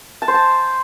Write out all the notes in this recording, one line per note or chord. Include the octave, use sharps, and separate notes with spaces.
A5
C5
A5